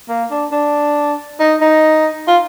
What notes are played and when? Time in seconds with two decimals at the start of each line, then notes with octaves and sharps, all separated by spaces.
0.09 A#3
0.31 D4
0.52 D4
1.40 D#4
1.61 D#4
2.27 F4